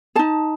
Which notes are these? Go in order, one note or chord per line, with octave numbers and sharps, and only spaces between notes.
D#4 G#4 A5